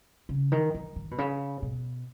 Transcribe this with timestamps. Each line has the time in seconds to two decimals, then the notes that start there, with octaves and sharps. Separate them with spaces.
0.29 C#3
0.52 D#3
0.74 E3
0.96 D#3
1.11 B2
1.18 C#3
1.62 B2